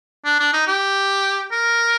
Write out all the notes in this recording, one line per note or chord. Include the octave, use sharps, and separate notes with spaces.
D4
D4
D#4
G4
A#4